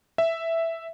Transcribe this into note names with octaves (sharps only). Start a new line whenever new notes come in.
E5